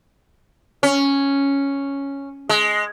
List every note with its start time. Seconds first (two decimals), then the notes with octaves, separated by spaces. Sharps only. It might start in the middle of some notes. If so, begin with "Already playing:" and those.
0.83 C#4
2.49 G#3